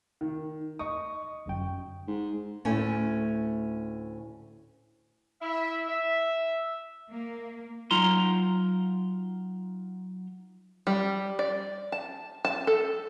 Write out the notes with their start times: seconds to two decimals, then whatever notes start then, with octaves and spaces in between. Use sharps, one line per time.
0.21 D#3
0.79 D#5 C#6 D#6
1.46 G1 F#2 G5
2.08 G#2
2.65 D2 A2 C#4 A4 G#5
5.42 E4 E5
5.88 E5
7.12 A#3
7.91 F#3 D#4 F4 A#5 C6
10.87 G3
11.39 D5
11.92 A5
12.45 A5
12.67 A4